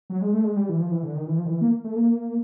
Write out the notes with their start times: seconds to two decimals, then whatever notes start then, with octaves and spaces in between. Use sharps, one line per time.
0.10 F#3
0.22 G#3
0.33 A3
0.45 G#3
0.57 G3
0.69 E3
0.80 F3
0.92 E3
1.03 D3
1.15 D#3
1.27 E3
1.38 F3
1.45 D#3
1.49 E3
1.61 A#3
1.84 A3
1.96 A#3